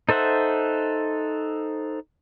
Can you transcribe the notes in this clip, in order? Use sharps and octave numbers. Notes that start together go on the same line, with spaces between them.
D#4 A4 C5 E5 F#5